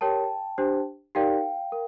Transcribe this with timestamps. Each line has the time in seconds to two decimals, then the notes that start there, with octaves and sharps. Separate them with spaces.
0.01 G4 A#4 C#5 G5 A5
0.58 D4 G4 C5
1.15 D#4 G4 A#4 D5 F5 G5
1.72 A#4